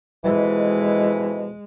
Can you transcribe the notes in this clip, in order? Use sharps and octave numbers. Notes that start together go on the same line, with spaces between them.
F2 B2 E3 G#3